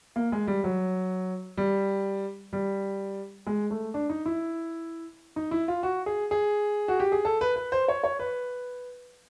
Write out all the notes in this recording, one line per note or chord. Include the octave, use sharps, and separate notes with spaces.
A#3
G#3
G3
F#3
G3
G3
G#3
A3
D4
D#4
E4
D#4
E4
F4
F#4
G#4
G#4
F#4
G4
G#4
A4
B4
B4
C5
C#5
C#5
B4